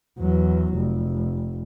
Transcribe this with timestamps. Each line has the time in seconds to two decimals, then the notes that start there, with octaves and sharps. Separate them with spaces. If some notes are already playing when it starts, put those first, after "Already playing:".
0.19 E2 F#3
0.74 F1